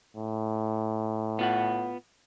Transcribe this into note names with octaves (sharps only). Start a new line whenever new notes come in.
A2
B3 F4 F#5